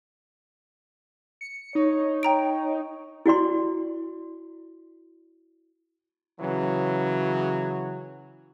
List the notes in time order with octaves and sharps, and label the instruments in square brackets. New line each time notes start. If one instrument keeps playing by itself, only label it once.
[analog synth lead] C#7
[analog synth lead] D#4 [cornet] C#5
[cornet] C#5 [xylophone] G5 A#5 D7
[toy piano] E4 F#4 D5 C6
[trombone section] C#3 E3 F#3